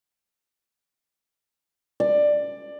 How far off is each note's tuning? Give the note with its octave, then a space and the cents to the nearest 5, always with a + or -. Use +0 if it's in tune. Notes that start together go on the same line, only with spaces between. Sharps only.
D5 +15